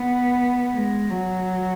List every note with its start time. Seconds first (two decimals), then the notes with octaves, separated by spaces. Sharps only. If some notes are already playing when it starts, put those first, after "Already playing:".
Already playing: B3
0.74 G#3
1.10 F#3